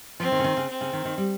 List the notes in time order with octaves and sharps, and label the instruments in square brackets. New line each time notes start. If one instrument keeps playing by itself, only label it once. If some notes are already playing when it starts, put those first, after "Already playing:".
[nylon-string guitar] F3 [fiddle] C4
[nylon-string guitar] D#3
C#3
D#3
C#3
[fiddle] C4
[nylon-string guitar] C#3
D#3
D#3
G3